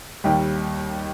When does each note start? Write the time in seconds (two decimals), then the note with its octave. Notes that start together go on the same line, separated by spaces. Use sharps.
0.24 D#2 D#3 G3 G4